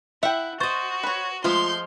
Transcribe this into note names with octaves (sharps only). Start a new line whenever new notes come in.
E4 E5 F#5 G5
F#4 C5 D#5 C#6 A6
B4 C#5
F3 G#3 A3 F4 F5 C6 G6